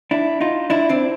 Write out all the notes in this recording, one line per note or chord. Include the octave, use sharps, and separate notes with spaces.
D4 E4
D#4 F4
D4 E4
C4 D4